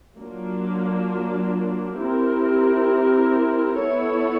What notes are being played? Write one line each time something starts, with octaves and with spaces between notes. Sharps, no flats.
F#3 A#3 D4 F4
C4 E4 G4 A#4
B3 E4 A4 C#5